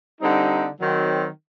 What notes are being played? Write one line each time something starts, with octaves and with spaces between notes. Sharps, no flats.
D3 G3 C4 D#4
D#3 F#3 C4